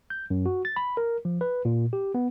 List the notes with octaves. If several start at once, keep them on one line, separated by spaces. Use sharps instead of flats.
G6
F#2
F#4
A6
B5
A#4
F3
B4
A#2
G4
B3